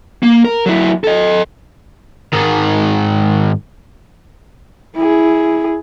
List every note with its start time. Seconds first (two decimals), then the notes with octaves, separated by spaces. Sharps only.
0.23 A#3
0.45 A#4
0.66 F#3 E4
1.04 A4 D#5
2.33 G#2 D#3
4.96 E4 G#4